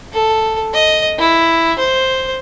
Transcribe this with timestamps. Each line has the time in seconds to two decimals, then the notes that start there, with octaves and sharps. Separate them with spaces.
0.13 A4
0.74 D#5
1.19 E4
1.79 C5